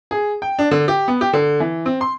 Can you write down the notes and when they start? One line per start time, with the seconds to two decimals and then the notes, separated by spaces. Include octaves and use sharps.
0.11 G#4
0.42 G5
0.59 D4
0.71 D3
0.88 G4
1.08 B3
1.21 G4
1.33 D3
1.60 E3
1.86 C4
2.01 C6